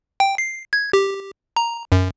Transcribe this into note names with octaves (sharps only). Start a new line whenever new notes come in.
G5
C7
G#6
G4
A#5
F#2